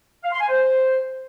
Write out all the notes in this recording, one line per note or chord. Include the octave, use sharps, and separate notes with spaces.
F5
C6
G#5
C5